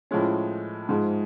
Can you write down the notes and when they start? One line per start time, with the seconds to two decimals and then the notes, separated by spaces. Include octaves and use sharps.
0.11 A2 F3 G#3 C#4
0.89 G#2 F3 G#3